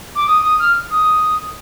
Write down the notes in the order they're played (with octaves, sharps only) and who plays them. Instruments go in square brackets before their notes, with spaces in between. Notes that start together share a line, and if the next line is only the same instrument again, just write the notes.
[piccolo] D6
D#6
D#6
F6
D#6